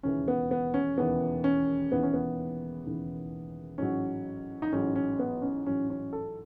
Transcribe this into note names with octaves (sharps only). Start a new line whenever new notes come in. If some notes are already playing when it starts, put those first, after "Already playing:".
E1 D#2 C#3 E3 C#4
B3
B3
C#4
E1 D#2 C#3 E3 B3
C#4
E1 D#2 C#3 E3 B3
C#4
B3
E1 D#2 C#3 E3
A1 G#2 F#3 C#4
D#4
A1 G#2 F#3 C#4
C#4
B3
C#4
A1 G#2 F#3 C#4
C#4
A4